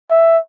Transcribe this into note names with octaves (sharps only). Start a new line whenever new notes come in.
E5